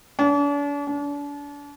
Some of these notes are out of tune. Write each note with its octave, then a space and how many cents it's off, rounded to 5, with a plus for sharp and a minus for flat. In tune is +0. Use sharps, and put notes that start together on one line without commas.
D4 -40
D4 -35